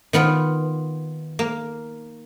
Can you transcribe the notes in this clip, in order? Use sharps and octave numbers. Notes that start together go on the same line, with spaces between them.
D#3 B3 F4 B4
A#3